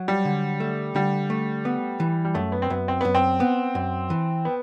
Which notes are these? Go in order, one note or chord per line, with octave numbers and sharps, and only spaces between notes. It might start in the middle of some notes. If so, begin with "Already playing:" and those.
Already playing: F#3
G3
D3
A3
D3 G3
A3
B3
E3
G3
F#2 A3
B3
C4
F#2 B3
C4
F#2 B3
C4
B3
F#2
E3
B3